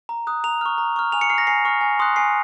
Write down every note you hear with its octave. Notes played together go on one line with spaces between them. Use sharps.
A#5
D#6 F#6
A#5 F7
C#6 F6
A#5
C#6 F6
G#5 F7
C#7
C#6 F6 C7
A#6
G#5 C7
C#6 F6
G#5
C6 D#6 F#6
G#5 C7